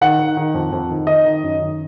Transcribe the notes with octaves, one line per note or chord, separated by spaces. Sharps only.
D#3 F#5
D#3
D#3
F2
F2
D#3
D#3 D#5
D#3
F#2
D#3